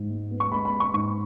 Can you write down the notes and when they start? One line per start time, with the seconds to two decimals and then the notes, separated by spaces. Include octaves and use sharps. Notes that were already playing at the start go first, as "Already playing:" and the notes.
Already playing: G#2
0.10 G#3
0.31 B3
0.40 C#6
0.52 G#3 B5
0.65 B5
0.73 B3
0.80 C#6
0.94 G#2 C#6